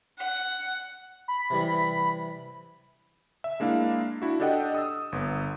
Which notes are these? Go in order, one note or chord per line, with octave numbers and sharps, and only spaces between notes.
F#5
B5
C3 E3 G3
E5
G#3 A#3 D4 E4 F5
D4 E4 F#4
D4 G4 A4 D#5 F#5 G5
D#6 E6
G1 B3